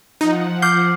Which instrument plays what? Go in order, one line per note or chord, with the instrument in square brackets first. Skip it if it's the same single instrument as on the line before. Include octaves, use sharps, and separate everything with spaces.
[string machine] F3 F#5 [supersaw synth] D#4
[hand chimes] D6 F6 C7 [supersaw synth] G6